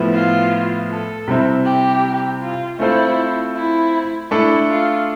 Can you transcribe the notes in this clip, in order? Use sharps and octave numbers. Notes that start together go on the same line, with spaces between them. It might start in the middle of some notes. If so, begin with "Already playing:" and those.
Already playing: A2 F3 B3 E4
F4
A4
C3 G3 C4 E4
G4
F4
A3 C4 E4 F4 A4 C5
E4
A3 D4 E4 A4
F4